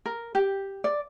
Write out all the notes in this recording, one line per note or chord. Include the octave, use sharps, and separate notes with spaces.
A#4
G4
D5